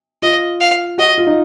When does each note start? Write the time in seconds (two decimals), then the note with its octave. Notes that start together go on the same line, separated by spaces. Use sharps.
0.22 F4 D#5
0.61 F5
0.98 F#4 D#5
1.18 F4
1.27 D#4